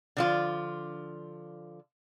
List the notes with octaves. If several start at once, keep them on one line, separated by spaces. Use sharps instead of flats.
D3 F3 F4